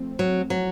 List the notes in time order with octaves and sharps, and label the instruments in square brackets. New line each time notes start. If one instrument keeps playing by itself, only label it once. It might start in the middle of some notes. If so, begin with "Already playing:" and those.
Already playing: [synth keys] F3 A3 C4
[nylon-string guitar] F#3
F#3